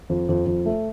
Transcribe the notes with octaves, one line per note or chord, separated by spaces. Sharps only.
F2
F2
F2
A3